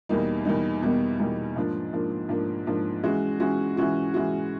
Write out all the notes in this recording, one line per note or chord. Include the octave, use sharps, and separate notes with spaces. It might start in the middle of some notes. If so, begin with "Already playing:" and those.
E2 B2 G3 A#3 D#4
E2 B2 G3 A#3 D#4
E2 B2 G3 A#3 D#4
E2 B2 G3 A#3 D#4
G#2 F3 A#3 D4
G#2 F3 A#3 D4
G#2 F3 A#3 D4
G#2 F3 A#3 D4
E3 G#3 C#4 F#4
E3 G#3 C#4 F#4
E3 G#3 C#4 F#4
E3 G#3 C#4 F#4